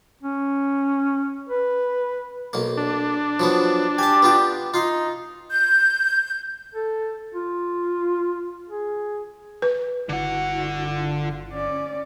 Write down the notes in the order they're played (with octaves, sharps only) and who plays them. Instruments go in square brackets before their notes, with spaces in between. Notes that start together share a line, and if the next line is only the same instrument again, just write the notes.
[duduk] C#4
B4
[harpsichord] B1 A#3
[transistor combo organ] D4
[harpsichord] F3 F#3 B3
[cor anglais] G4 [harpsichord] G#5 A5
[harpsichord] B3 F4 G5
[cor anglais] D#4 [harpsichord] F4 C6
[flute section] G6
[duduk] A4
F4
G#4
[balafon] B4
[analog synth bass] G1 [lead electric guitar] D3 F#5 [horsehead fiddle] E4 F#4
[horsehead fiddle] F4
C#4 D5